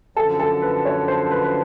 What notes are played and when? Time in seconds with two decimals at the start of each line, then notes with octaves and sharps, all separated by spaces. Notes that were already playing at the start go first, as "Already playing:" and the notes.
0.16 F#2 D3 F3 A4
0.40 A4
0.62 B4
0.85 C#5
1.08 C5
1.31 B4
1.44 B4